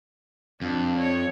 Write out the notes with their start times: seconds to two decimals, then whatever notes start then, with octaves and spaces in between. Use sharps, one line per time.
0.62 F2 D4
0.98 C#5